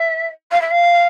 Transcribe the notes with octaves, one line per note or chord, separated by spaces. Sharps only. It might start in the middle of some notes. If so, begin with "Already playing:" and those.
Already playing: E5
F5
E5
F5